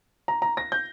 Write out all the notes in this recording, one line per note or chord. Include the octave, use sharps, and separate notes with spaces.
A#5
A#5
A#6
G6